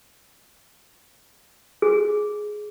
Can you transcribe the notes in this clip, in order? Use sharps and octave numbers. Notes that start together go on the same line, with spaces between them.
G#4